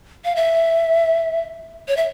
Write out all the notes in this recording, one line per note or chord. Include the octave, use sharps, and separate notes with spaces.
F5
E5
C#5
E5